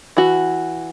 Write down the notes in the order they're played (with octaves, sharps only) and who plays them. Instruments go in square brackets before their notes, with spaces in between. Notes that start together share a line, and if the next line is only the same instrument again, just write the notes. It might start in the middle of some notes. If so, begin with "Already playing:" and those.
[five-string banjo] E3 F#4